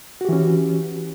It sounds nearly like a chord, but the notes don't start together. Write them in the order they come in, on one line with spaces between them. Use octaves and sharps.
F#4 G4 E3 C#4